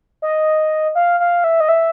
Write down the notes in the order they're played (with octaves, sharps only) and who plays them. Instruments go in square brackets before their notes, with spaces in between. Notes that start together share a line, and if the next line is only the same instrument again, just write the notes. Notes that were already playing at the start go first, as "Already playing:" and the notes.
[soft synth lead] D#5
F5
F5
E5
D#5
E5